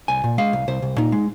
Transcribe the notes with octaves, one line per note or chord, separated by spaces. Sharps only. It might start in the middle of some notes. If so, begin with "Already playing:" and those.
C2 G#5
A#2
G#3 F5
C2
C2 C5
C2
A#2 D#4
G#3